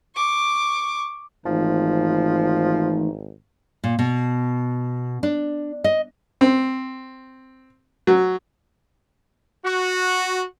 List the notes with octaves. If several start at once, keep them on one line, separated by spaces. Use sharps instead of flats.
C#6 D6
G#1 E3 F3 A3 D#4
A#2
B2
D4
D#5
C4
F#3
F#4